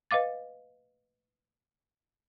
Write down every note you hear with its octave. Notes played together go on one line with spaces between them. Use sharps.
B4 D#5 F5 D6 A6